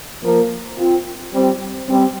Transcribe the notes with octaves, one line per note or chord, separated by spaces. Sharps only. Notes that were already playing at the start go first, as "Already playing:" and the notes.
F3 A#3
C4 F4
G3 C4
G3 C4